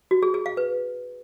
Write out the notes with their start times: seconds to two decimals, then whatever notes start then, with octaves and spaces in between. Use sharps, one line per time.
0.11 F#4
0.23 G#4
0.34 G#4
0.46 F5
0.57 B4